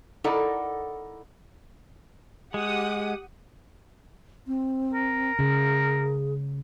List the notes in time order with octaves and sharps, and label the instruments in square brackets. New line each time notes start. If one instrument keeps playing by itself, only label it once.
[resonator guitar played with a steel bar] D#4 E4 A4 A#4 D5 F#5
[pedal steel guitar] G#3 [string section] G4 F#5 D#6
[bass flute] C4
[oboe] A#4
[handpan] C#3 [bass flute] G#4